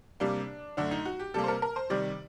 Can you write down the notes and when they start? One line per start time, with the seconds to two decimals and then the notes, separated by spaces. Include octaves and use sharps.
0.20 C3 G3 A#3 D4
0.77 F#2 D3 A3 D4
0.91 D#4
1.05 F#4
1.20 G4
1.34 C3 G3 A#3 A4
1.44 C5
1.48 A#4
1.62 A#4
1.76 C5
1.90 C3 D#3 G3 D5